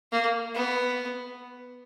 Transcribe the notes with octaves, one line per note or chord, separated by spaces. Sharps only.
A#3
B3